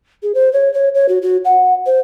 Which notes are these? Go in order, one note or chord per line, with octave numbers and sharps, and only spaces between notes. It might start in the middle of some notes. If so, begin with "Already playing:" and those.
G#4
C5
C#5
C#5
C#5
F#4
F#4
F#5
C5